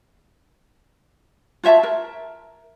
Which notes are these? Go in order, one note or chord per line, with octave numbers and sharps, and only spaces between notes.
F4 C#5 E5 A5
A#4